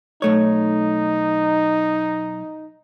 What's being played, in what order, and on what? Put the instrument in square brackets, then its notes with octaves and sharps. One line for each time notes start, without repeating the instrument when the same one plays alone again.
[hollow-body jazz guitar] B1 A3 C#5 [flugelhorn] D#4